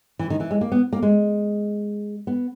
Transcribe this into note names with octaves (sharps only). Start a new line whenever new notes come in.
E3
D#3
E3
G#3
A#3
B3
A#3
G#3
B3